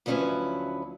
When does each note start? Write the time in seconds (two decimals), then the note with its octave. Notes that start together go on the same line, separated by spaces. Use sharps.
0.06 D2 F3 F#3 C#4 E4 B4